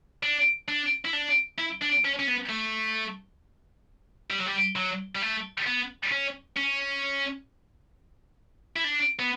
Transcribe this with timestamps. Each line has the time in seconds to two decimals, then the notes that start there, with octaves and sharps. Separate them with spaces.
0.23 D4
0.68 D4
1.05 E4
1.13 D4
1.58 E4
1.82 D4
2.05 C#4
2.19 C#4
2.27 B3
2.49 A3
4.30 G3
4.39 F#3
4.46 G3
4.76 F#3
5.15 G3
5.22 A3
5.67 B3
6.12 C#4
6.57 C#4
8.76 E4
8.84 D4
9.19 B3